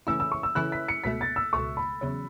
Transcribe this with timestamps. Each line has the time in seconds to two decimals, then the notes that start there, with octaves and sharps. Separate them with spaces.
0.07 C#3 E3 A3 C#4 E4 E6
0.20 E6
0.32 C#6
0.43 E6
0.55 C#3 E3 A3 C#4 E4 F#6
0.72 B6
0.88 C#7
1.04 C#2 B2 A3 B6
1.21 A6
1.36 E6
1.53 C#2 B2 A3 C#6
1.77 B5
2.01 E2 C#3 F#3